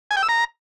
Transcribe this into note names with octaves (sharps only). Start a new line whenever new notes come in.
G#5
G5
E6
A#5